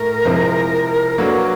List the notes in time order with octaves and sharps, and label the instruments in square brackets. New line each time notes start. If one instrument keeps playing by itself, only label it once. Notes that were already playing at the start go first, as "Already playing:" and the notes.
Already playing: [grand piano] A2 A3 [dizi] A#4
[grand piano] C3 F3 G#3 C4 E4
[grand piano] F#3 A#3 D4 F#4 B4 [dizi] A4
[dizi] A#4